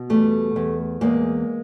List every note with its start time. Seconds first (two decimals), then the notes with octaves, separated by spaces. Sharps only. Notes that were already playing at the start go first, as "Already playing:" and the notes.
Already playing: B2
0.10 E2 G3 A3
0.56 E2
1.01 E2 G#3 A#3